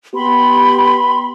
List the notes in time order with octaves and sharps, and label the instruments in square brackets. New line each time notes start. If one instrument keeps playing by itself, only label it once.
[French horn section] B3 G4 [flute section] B5 C6